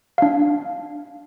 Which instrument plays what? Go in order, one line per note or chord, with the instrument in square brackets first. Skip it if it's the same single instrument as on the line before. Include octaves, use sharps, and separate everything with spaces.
[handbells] D4 F5